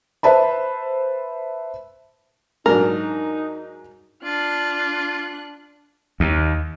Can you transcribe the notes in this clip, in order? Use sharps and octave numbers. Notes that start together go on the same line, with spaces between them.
B4 C5 E5 A5 B5
G#2 F#3 D4 D#4 A#4
D4 F4 F#6
D#2